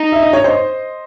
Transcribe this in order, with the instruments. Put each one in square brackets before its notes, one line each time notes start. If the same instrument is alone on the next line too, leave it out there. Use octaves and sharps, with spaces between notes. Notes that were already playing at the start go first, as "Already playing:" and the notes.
Already playing: [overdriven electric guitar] D#4
[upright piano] E5
D#5
C#5
C5 D#5